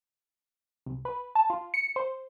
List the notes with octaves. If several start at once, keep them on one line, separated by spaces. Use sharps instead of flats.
C2
B4
A5
F4
C#7
C5